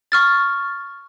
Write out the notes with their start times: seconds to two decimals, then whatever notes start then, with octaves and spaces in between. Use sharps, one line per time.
0.12 C#6 F6 A6